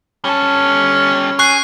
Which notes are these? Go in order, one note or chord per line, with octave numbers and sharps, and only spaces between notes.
G3 C#4 A4
G#4 C#6 F#6 C7